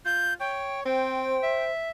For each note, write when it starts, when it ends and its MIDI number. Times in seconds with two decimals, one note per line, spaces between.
0.05 0.34 65
0.05 0.34 91
0.40 0.85 73
0.40 0.81 79
0.85 1.35 60
0.85 1.71 72
0.85 1.64 79
1.43 1.90 76